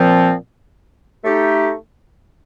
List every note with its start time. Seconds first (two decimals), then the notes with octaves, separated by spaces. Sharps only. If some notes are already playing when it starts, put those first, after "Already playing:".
Already playing: A#2 F3 C4
1.23 A3 D#4 G4